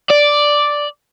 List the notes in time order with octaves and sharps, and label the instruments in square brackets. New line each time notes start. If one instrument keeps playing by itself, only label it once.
[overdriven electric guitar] D5